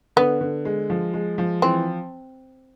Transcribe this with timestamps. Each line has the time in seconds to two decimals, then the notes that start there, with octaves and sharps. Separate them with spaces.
0.16 D3 B3
0.41 D3
0.65 G#3
0.90 F3
1.14 G#3
1.38 F3
1.62 E3 C4